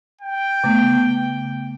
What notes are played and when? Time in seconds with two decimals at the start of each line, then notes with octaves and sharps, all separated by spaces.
0.21 G5
0.64 C#3 A3 B3